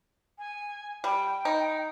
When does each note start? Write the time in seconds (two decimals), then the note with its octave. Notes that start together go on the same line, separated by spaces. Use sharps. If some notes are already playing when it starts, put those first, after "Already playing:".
0.38 G#5
1.04 G3 G5
1.45 D#4